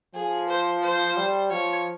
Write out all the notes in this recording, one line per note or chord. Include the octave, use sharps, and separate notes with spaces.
F3 G#4
C5
C5
G3
F3 C#5